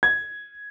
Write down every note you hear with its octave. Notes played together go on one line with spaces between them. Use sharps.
G#6